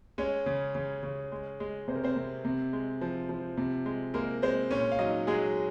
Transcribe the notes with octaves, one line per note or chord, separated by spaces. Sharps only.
G#3 C#4 C#5
C#3
C#3
C#3
G#3
G#3
C3 C5
A#4
C4 C5
C3
C3
G#3
F3
F3
C3
G#3
G#3 A#3 A#4
G#3 C4 C5
A#2 C#4 C#5
F5
F#3 D#4 D#5
F#3 G#3 G#4